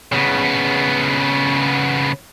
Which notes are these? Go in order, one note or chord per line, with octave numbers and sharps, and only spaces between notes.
C#3 B3